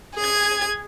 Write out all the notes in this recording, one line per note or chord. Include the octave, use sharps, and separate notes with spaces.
G#4 G#6